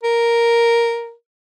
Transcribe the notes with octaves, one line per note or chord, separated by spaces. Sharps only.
A#4